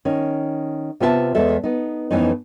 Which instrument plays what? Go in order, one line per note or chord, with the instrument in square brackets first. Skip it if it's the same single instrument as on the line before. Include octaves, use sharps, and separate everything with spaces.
[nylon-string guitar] D#3 C#4
C3 B3 F4 E5 G5 A5
E2 G#3 A4 E5
B3 D#4
F2 E3 A3 B3 C#4 D#4